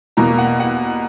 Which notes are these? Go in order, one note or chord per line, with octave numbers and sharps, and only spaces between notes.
E2 B2 A#3 A#5
F#5
F#5